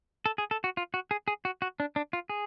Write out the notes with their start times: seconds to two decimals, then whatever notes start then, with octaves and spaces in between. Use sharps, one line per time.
0.26 A4
0.38 G#4
0.51 A4
0.64 F#4
0.77 F4
0.94 F#4
1.11 G#4
1.28 G#4
1.45 F#4
1.62 F#4
1.80 D4
1.96 D4
2.13 F4
2.30 G#4